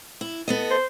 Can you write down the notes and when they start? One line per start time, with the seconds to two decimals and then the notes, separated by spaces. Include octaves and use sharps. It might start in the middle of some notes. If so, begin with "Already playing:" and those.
0.21 E4
0.48 B3 A4 D#5
0.71 C5